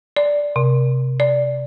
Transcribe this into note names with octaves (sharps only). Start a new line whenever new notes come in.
D5
C3
D5